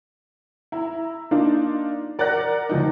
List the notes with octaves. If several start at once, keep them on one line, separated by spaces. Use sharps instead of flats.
E4 A#5
A#3 D4 D#4 F4
A#4 D5 F#5 A#5 F#6 A#6
D#2 F3 D#4